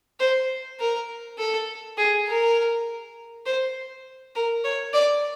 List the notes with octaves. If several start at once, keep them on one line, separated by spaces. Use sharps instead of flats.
C5
A#4
A4
G#4
A#4
C5
A#4
C#5
D5